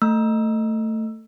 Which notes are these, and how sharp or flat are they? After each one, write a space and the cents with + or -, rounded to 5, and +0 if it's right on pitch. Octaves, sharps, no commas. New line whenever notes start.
A3 +15 E6 +15